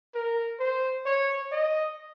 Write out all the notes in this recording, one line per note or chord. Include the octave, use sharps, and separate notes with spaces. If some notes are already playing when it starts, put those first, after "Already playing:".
A#4
C5
C#5
D#5